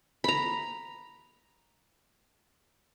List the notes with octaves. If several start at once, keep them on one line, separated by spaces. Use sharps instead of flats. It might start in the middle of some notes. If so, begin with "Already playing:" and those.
A#5 B5